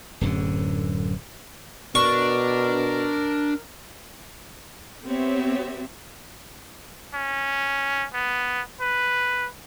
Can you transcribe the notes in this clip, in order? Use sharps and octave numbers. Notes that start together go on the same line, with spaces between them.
D1 F#2 D3
B2 D4 A#4 C#6
B3 C4 G4 C#5 E5
C#4
B3
B4